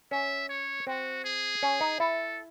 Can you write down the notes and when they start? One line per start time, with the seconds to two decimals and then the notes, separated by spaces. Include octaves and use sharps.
0.11 C#4 E5
0.49 C#5
0.87 C4 F#4
1.24 G#4
1.63 C#4
1.81 D#4
2.00 E4 A4